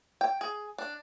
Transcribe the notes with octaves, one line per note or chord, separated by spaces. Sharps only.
G5
G#4
D4